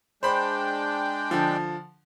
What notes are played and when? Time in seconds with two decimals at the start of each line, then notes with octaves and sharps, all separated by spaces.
0.23 G#3 D4 C5 G5 B5
1.31 D3 F3